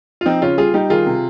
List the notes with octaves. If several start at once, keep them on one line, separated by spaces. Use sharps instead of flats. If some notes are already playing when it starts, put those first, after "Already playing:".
F4
F3 C4 D#4
C#3 C#4 F4
G3 F4 G#4
G3 D#4 G4
D#3 F4 G#4
C3